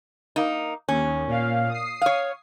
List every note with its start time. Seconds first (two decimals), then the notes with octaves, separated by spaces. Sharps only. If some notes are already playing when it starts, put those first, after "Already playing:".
0.36 A#3 D#4
0.89 D#2 C#4
1.27 A#2 F5
1.69 D#6 C7
2.02 C#5 F5